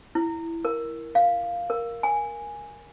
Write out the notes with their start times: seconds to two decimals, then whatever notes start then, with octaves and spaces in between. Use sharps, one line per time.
0.15 E4
0.65 A#4
1.15 F5
1.70 A#4
2.03 G#5